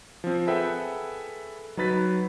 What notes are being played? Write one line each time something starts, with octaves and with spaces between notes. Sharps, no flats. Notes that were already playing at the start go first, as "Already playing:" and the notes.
F3 C4
G#4 A4 B4 E5 F#5 G5
F#3 D#4 B4 A6 B6